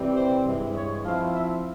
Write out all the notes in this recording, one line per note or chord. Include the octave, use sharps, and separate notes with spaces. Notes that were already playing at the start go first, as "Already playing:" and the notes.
Already playing: C3 E3 G3 C4
C5
G2 E3 G#3
C#5
F3 C4 E4 F5
E5